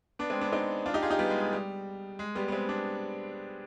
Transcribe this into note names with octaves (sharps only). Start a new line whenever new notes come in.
B3 D4
G#3 C4
B3 D4
C4 D#4
D4 F4
D#4 G4
F4 G#4
D#4 G4
G3 B3
G#3
G#3
G3
G#3
G3 B3
B3
G#3 C4
B3 D4